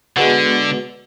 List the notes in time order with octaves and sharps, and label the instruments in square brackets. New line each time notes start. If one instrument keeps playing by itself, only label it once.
[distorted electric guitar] D3 [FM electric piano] G#3 B3 F#4